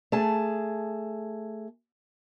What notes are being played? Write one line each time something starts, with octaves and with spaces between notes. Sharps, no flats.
A3 G#4 A5